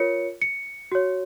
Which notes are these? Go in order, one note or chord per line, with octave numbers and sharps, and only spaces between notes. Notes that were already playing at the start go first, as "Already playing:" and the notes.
Already playing: F4 A#4 C#5 C#7
C#7
F#4 C#5